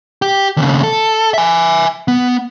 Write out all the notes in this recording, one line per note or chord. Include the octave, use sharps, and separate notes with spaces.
G4
D#2 C#3
A4
E5 G#5
B3